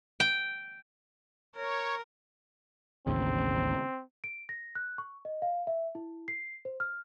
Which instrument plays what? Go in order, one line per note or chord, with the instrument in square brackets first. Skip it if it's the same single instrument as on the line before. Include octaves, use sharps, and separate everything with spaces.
[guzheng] G5
[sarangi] A#4 [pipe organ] C#5
[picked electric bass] A1 D#2 C#3 [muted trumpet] C4
[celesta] D7
A#6
F#6
C#6
D#5
F5
E5
E4
C7
C5
F6